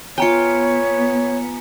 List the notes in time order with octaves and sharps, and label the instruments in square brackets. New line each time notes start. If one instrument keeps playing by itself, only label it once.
[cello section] B3 [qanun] F4 G5 [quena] C#5 [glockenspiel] G#5 A#5 C#7